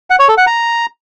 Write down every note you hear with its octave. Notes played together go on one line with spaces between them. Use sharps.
F#5
C#5
A4
F#5
A#5